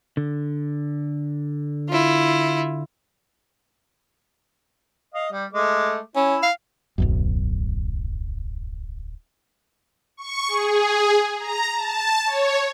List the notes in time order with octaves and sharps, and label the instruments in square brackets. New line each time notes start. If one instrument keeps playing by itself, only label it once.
[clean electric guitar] D3
[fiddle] E4 F4
[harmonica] D#5 F5
G3
G#3 A3 D6
[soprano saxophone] C#4 [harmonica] E4
[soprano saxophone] F5
[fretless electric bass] D1 B1 F#2
[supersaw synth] C#6
G#4
A#5
A5
C#5